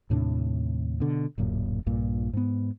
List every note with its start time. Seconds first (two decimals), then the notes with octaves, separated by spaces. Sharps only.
0.10 D#2 A2 C3 D4
1.00 B2 D3
1.38 D1 F#2 A#2
1.86 A#1 G2 A#2
2.33 G#2 B3